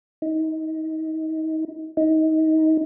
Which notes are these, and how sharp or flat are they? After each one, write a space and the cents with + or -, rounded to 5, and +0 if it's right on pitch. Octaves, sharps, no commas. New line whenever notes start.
D#4 +30
D#4 +25